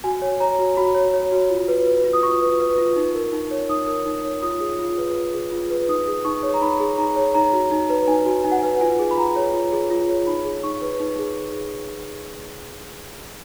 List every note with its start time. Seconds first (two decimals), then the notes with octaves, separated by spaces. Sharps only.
0.04 F#4 G#5
0.22 C#5
0.40 C#5 A#5
0.59 F#4
0.77 F#4 B5
0.95 C#5
1.14 C#5
1.32 F#4
1.50 F4
1.68 B4
1.87 B4
2.04 F4
2.13 D#6
2.23 F4 C#6
2.42 B4
2.59 B4
2.78 F4
2.96 D#4
3.15 A#4
3.32 D#4
3.51 C#5
3.69 D#4 D#6
3.87 A#4
4.06 D#4
4.24 C#5
4.42 F4 D#6
4.60 G#4
4.79 F4
4.98 B4
5.16 F4
5.34 G#4
5.52 F4
5.70 B4
5.88 D#4 D#6
6.07 G#4
6.25 D#4 C#6
6.43 C#5
6.54 A#5
6.61 D#4 B5
6.80 G#4
6.98 D#4 A#5
7.16 C#5
7.34 D#4 A#5
7.53 F#4
7.72 D#4
7.90 B4
8.08 D#4 G#5
8.26 F#4
8.44 D#4 G#5
8.52 F#5
8.59 B4 G#5
8.81 F4 G#5
8.99 G#4
9.11 B5
9.18 F4 A#5
9.36 C#5
9.54 F4
9.73 G#4
9.90 F4
10.09 C#5
10.27 D#4 B5
10.45 G#4
10.63 D#4 C#6
10.82 B4
11.00 D#4
11.19 G#4